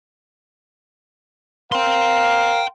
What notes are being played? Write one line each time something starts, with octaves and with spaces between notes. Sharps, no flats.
A#4 F5 G5 C6